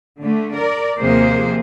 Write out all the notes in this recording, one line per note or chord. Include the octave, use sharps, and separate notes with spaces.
D3 A3
A#4 D5
D#2 C3 F3 A#3 G#4 C5